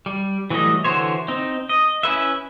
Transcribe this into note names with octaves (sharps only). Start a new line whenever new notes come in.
G3
E3 F#3 G3 A3 D#5
D3 E3 F#4 C5 C#5
C4 D#4
D#5
C#4 E4 B4 E5